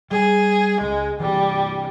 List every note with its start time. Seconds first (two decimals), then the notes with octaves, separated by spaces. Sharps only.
0.11 G3 G#4
0.81 C#2 G#3
1.20 C2 E3 G3